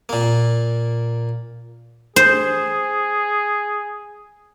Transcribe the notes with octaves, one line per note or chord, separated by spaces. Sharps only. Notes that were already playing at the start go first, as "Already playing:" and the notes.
A#2 A#3
G#4 C5